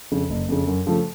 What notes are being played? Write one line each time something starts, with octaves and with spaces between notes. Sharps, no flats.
F2 C#3
F#1
F2 C#3
F#2
C#3 F3 A3